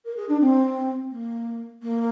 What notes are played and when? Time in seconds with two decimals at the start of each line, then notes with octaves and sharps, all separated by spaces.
0.05 A#4
0.16 G#4
0.28 D4
0.40 C4
1.11 A#3
1.82 A#3